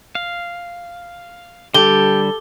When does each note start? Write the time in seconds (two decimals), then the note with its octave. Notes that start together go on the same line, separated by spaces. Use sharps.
0.15 F5
1.74 D3 G3 G4 A4 G7